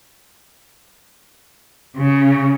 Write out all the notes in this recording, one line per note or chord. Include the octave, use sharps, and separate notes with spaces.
C#3